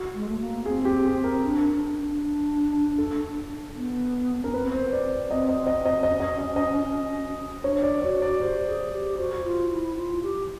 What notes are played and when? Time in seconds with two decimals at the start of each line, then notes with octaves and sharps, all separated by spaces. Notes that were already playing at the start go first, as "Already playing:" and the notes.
Already playing: F#4
0.14 G#3
0.29 A3
0.41 A#3
0.66 C4 G#4
0.85 G4
1.05 G#4
1.24 A#4
1.43 D4
1.70 D4
1.95 D4
2.98 A4
3.76 B3
4.43 C#4 A#4
4.53 C4 B4
4.73 C5
4.93 D5
5.31 C4 D#5
5.49 D#5
5.67 D#5
5.85 D#5
6.03 D#5
6.08 C#4
6.20 D#5
6.38 D#5
6.56 D#5
7.63 D4 C#5
7.82 D5
8.02 F#4 C#5
8.22 D5
8.41 G4 C5
8.67 G#4
8.92 G4
9.18 F#4 C5
9.44 F4
9.70 E4
9.96 F4
10.23 G4